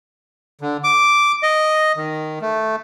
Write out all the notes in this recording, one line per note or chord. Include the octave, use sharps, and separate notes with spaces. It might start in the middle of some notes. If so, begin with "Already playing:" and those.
D3
D6
D#5
D#3
A3